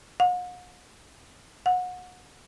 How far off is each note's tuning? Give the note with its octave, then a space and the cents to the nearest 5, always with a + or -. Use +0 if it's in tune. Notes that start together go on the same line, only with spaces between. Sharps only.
F#5 -45
F#5 -30